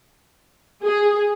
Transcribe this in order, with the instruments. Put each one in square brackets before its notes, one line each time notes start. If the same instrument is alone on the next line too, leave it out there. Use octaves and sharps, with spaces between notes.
[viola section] G#4